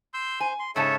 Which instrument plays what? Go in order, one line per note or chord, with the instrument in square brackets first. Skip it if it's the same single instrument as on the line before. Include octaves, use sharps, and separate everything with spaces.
[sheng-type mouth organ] C6 E6 G6
[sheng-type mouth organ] C5 [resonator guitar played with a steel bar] G#5
[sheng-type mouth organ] C6
[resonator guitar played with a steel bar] G#2 C#3 A5 [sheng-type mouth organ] A4 C#5 E5